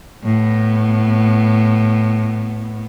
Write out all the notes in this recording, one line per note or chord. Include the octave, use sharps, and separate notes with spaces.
A2 B3